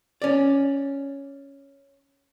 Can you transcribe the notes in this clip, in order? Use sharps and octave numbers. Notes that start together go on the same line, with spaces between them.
C#4 D5